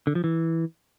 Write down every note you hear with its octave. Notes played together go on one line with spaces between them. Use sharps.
D3
F3
E3